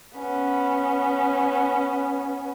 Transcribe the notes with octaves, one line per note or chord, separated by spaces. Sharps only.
B3 C#4